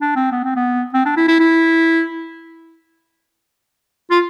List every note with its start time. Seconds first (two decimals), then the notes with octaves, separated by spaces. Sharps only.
0.01 D4
0.16 C4
0.32 B3
0.44 C4
0.56 B3
0.94 C4
1.06 D4
1.17 E4
1.28 E4
1.39 E4
4.11 F4